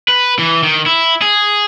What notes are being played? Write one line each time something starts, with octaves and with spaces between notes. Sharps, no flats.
B4
E3
D#3
E4
G#4